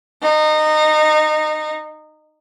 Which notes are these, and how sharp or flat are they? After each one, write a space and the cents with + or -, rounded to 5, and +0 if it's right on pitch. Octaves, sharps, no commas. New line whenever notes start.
D#4 -20